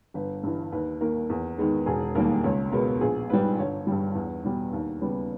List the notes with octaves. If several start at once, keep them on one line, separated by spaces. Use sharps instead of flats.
G1 B4
G2 E3
D#2 B4
D#3 A#3 A#4
E2
D#3 G#3 B3
E1 G#4
D#2 D#3 G3 A#3 A#4
C#2 C#5
B2 G#3 B3 A#4
A#1 G#4
G#2 G3 B4
G1 C#5
G2 G3
E2
B2 G3 B3
D#2
C#3 G3 B3